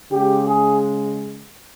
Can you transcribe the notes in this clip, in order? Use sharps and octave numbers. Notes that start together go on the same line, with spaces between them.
C#3 G#3 G4
G#4